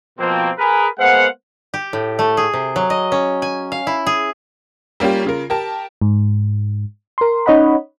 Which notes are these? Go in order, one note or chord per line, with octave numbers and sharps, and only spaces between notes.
B2 F3 A#3 C4
G#4 A#4 B4
G#3 A#3 B3 C5 F5 F#5
G4
A2
A3
G#4
C3
F#3
D#5
C#4
G#5
F5
E4
G#4
G3 A#3 C#4 F4 G4
C#3 F4 A#4
G4 A#4 A5
G#2
A#4 C6
C#4 D#4 C#5 D#5 F#5 B5